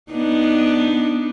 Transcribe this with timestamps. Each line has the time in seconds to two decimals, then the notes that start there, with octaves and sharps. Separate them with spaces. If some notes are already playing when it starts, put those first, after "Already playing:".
0.12 B3 D4 D#4